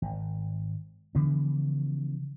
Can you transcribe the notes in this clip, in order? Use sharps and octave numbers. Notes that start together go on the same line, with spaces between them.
G#1
C#3 E3 F3 B3